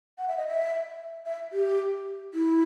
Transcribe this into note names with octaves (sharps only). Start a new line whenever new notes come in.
F#5
E5
D#5
E5
E5
G4
E4